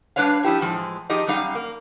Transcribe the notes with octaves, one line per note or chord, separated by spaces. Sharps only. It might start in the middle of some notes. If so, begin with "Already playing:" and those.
G3 D4 B4 C#5 F5
F3 D#4 E4 G4
A2 E3 F3 G#3
F3 D#4 G4 G#4 D#5
F#2 G3 D#4 F5
A#3